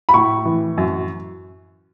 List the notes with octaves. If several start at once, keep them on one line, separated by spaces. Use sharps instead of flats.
B5
A2 C#6
E3
F#2